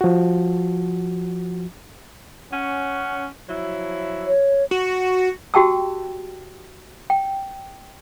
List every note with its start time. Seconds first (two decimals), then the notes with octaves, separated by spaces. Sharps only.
0.01 F3 F#4
2.52 C#4 F#5
3.49 F3 F#3 E4
4.27 C#5
4.71 F#4
5.54 F#4 G4 G5 A5 E6
7.10 G5